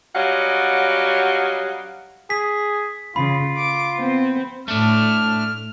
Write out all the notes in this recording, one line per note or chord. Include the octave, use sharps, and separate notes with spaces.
F#3 G3 C#4 D#5 F5 F#5
G#4 B6
C#3 F4 B5
D6
B3 C4
A2 A3 D4 F6